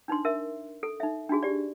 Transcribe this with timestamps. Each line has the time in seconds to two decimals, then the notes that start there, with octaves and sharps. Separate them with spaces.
0.08 D4 D#4 B4 C6
0.25 A#4 E5
0.83 A4
1.00 D#4 E5
1.29 D4 D#4 F#4 G#4
1.43 G4 D5